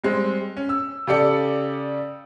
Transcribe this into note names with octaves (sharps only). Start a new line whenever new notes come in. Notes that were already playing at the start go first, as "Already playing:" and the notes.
G3 G#3 C4
C#4
E6
C#3 G4 A4 D5 C#7